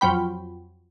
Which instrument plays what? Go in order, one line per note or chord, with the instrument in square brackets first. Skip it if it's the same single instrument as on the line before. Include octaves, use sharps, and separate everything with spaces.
[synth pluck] F2 F#3 G5 B5